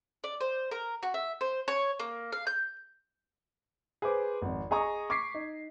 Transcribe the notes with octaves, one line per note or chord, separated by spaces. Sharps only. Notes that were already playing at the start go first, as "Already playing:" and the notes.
D5
C5
A#4
F#4
E5
C5
C#5
A#3
F5
G6
G#4 B4 C5 D6
G#1 F2
G#4 D#5 G#5 A#5 C#6 D#6
C#6 D6 G#6 B6 C7
D#4